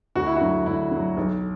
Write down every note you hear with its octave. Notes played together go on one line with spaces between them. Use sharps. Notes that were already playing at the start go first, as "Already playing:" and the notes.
D2 F#4
E4
F#4
D3 F#3
D2 E4
D3 F#3
B1